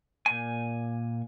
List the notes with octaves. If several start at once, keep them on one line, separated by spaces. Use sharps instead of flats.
A#2 G#5